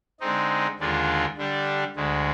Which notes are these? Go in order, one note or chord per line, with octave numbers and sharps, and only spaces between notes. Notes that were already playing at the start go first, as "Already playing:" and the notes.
D3 G#3 C4 D#4
D#2 D3 G#3 D4 F4
D3 G3 D4 G4
D2 D3 G#3